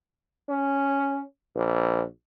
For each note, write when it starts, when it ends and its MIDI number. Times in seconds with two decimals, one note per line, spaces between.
0.49 1.22 61
1.56 2.04 34